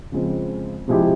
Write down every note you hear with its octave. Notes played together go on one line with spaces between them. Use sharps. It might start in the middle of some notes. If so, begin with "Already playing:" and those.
C#3 F3 G#3 C4
C3 F3 G#3 E4 G4